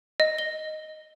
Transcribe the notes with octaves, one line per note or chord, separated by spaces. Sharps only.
D#5
G7